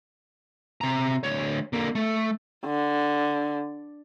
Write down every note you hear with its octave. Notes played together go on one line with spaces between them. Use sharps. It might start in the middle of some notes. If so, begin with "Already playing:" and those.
C3 A#5
D2 C#5
D3 A#3
A3
D3